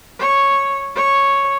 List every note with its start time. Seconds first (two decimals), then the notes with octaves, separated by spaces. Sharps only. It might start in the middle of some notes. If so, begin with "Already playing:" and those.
0.20 C#5
0.96 C#5